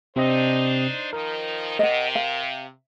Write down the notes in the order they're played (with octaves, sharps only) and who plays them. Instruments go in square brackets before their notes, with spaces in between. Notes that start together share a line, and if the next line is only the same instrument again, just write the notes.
[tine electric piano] C3 C4 D#5 [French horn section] D4 D#4 C5
[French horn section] D#3 F3 D#4 [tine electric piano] A#4
[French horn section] C3 [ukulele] D#5 F#5
[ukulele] F5